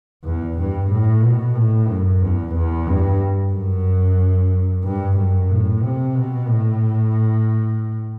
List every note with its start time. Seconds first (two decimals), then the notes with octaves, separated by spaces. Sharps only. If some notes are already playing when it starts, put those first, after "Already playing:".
0.24 E2
0.58 G2
0.90 A2
1.23 B2
1.56 A2
1.88 F#2
2.21 E2
2.55 E2
2.87 G2
3.52 F#2
4.84 G2
5.17 F#2
5.50 A2
5.82 C3
6.15 B2
6.48 A2